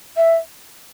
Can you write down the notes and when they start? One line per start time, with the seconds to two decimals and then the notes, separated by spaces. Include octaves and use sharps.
0.17 E5